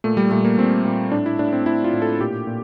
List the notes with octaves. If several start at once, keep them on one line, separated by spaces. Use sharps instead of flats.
A#2 A3
G3
A#2 A3
A#3
A#2 C4
A#2
A2 D4
E4
A2 D4
C4
A2 E4
F4
A2
A4
A#2 G4
A#2